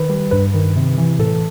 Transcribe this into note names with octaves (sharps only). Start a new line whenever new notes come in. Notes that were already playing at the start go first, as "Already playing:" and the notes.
Already playing: D#3 B4
G3
G2 B4
D#3
C3
E3
A2 A4